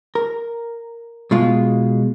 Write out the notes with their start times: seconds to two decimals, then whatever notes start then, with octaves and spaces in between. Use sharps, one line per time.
0.15 A#4
1.31 B2 G#3 F4